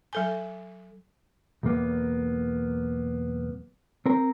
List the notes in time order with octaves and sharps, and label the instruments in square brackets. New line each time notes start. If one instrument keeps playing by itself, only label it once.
[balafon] F#3 A4 G#5
[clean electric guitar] B1 E2 A#3 B3
C4 A#4